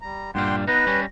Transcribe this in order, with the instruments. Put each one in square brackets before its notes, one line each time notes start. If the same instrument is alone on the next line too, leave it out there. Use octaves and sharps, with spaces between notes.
[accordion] G3 A#5
[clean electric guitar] G2 A#2 G3 [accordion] F#5 G5 C6
[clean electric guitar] B3 D#4 [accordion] B4 [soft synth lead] A#6
[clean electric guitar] G3 C#4